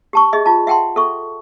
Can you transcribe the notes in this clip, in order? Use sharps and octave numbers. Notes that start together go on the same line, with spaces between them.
G4 A5 C#6
G#4 D#5 E5
F4 A5
E5 F#5 G5 A5 C6
A4 E5 C#6